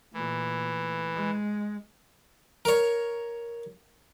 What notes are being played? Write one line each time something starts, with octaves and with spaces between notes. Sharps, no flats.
A#2 E3 A3
G#3
A#4 C#5